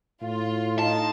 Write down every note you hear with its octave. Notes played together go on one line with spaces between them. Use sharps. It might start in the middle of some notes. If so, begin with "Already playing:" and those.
A2 F4
D#4 F4 D#5 A5